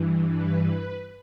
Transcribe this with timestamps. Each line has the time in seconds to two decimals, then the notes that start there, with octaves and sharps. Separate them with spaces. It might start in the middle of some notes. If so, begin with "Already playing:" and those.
Already playing: G2 E3
0.25 B4
0.61 B4